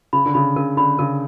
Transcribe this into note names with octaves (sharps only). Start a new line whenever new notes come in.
C#3 B5
D3
C#3 B5
C#3 A#4
D3 B5
C#3 A#4